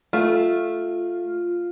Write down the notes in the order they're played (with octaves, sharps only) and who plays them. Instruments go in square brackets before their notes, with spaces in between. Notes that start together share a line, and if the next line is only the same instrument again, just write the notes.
[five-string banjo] A3 [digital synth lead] F4